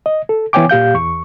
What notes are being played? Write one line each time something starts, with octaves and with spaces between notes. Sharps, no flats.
D#5
A4
E3 B3 C#5 G5 G#5 D6
A#2 G4 F5 G6
E2 C#6